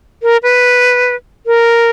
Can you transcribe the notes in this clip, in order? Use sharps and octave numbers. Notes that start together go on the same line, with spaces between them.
A#4
B4
A#4